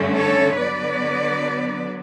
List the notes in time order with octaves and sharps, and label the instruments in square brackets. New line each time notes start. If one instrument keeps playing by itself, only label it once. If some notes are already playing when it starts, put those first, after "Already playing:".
Already playing: [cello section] G2 D3 A3 C#4
A4 C#5
D3 F#3 B3 B4 D5